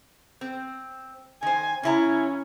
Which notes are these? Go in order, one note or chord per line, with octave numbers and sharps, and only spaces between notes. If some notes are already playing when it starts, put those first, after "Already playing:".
C4
D#3 C5 G#5
C#3 C#4 E4 A#5